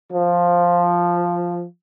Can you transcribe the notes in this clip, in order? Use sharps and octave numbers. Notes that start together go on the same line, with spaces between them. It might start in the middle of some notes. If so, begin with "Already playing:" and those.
F3